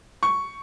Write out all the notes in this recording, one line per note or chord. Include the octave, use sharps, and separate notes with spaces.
C#6